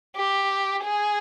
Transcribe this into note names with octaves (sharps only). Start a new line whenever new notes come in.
G4
G#4